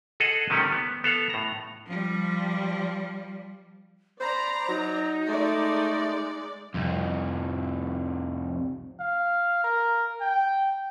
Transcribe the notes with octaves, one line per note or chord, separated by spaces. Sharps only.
G#4 A4 D#5 F#5
C3 D#3 G3 A3 C#4
B3
B3 A4 F5
A2 A#5
F3 G3
C5 D5 A#5 B5
F#3 D#4
G#3 A3 D5
C2 F2
F5
A#4
G5